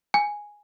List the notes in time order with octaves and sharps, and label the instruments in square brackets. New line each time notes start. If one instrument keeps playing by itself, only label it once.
[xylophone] G#5